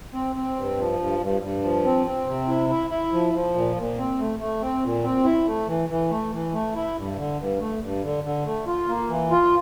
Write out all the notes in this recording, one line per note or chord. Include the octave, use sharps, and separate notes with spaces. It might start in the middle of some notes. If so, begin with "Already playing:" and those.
C4
C4
G2
F3
G2
G2
G2
F3
C4
C4
C3
E4
E4
E4
F3
F3
A#2
A#2
C4
A3
A3
C4
A#2
C4
E4
A3
E3
E3
A3
E3
A3
E4
G2
D3
G2
A3
G2
D3
D3
A3
F4
A#3
E3
F4